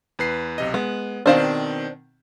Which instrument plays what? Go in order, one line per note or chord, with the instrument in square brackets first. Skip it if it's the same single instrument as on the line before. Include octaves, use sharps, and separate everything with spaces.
[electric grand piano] E2 B4 C7
B1 C3 D#5
[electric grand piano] G#3 [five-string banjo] B3
[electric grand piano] B2 D#3 C4 [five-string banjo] D4 C5 F5